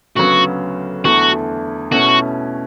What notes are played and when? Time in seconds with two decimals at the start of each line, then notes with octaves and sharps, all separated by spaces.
0.16 D2 C#3 F#3 B3 F#4
1.04 E2 D3 A3 E4 F#4
1.92 B2 A3 C#4 E4 F#4